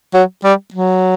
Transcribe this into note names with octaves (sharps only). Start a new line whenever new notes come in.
F#3
G3
F#3